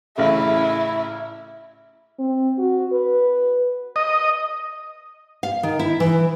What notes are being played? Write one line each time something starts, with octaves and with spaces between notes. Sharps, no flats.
A1 C#3 E4
C4
F#4
B4
D#5
F5
D#3
E4
E3